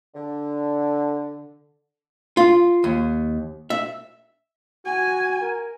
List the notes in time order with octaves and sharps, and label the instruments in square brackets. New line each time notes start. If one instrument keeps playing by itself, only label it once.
[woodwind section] D3
[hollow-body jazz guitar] F4
D#2
E5
[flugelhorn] F#4 [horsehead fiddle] G#5
[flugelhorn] A#4